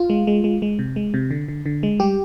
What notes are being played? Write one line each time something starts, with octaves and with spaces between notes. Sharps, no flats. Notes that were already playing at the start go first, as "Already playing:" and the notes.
Already playing: F4
G#3
G#3
G#3
G#3
C3
G#3
C3
D3
D3
D3
G#3
G3 G4